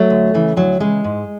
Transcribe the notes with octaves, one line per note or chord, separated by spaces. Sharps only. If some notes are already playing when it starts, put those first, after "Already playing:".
Already playing: F#3 A3
D2
C#3 E3
D2 F#3
C#3 E3 G#3
G#2